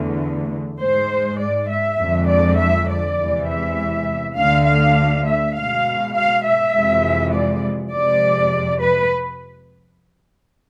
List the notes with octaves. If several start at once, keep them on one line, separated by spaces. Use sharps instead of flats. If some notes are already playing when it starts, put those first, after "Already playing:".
Already playing: E2 D3 A3
G#2 G#3 C5
D5
E5
F2 D3 G#3
D5
E5
D5
E2 C3 E3 G#3
E5
D2 D3 A3 F5
F5
E5
B2 G#3 F5
F5
E5
F2 C3 E3 G#3
D5
F2 C3 G#3 D5
B4